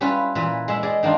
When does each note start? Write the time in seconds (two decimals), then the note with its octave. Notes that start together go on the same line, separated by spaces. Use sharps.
0.01 G3 C#4 E4 F4 B4
0.35 A#2 E3 F4 B4
0.68 G#3 E5
0.83 G#4 D5 D#5
1.03 D#3 A#3 D4 F4